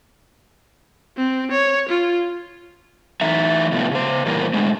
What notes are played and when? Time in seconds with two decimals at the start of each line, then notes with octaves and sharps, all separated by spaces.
1.17 C4
1.52 C#5
1.89 F4
3.21 E3 A3 D#4 E5 A#5
3.72 A2 C3 F3 A3 B3
3.91 C#3 C5
4.26 A#2 E3 G3 A#3 A#4
4.54 G#2 B2 D3 G#3 A3